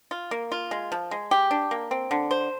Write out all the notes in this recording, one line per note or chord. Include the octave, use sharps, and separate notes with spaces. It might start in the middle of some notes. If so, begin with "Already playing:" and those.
F4
A#3
F4
G#3
F3
G#3
G4
D4
A#3
C4
D3
C5